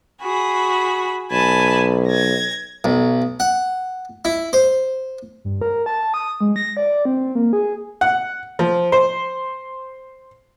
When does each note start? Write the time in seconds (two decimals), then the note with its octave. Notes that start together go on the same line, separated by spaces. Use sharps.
0.21 F#4 G#4 B5
1.31 B1 G#5 A5 B5
2.08 G#6 A#6
2.84 B1
3.40 F#5
4.25 E4
4.53 C5
5.44 G2
5.62 A#4
5.86 A5
6.14 D#6
6.41 G#3
6.56 A#6
6.77 D5
7.05 C4
7.35 A#3
7.53 G#4
8.01 F#5
8.59 F3
8.92 C5